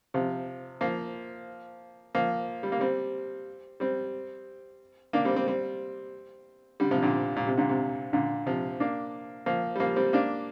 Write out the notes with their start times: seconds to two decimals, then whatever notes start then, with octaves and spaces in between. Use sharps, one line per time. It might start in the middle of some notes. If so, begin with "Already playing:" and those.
0.14 C3 F3
0.81 F3 A#3
2.15 F3 A#3
2.63 G3
2.72 A#3
2.80 G3 C4
3.80 G3 C4
5.13 A#3 D4
5.25 G3 C4
5.36 G3 C4
5.47 G3 C4
6.80 D3 G3
6.91 C3 F3
7.02 A#2 D3
7.36 A#2
7.47 C3
7.58 A#2 D3
7.69 C3
8.13 A#2 D3
8.46 C3 F3
8.80 A#3 D4
9.46 F3 A#3
9.76 G3
9.80 F3 A#3
9.96 G3 C4
10.13 A#3 D4